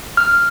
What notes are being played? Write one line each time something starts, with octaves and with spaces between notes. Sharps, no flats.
F6